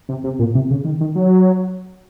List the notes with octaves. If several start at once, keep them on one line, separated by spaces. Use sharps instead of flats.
C3
C3
A#2
C3
C#3
D#3
D#3
F#3